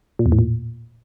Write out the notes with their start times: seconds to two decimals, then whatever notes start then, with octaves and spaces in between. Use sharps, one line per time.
0.19 A#2
0.26 E2
0.32 A2
0.39 A#2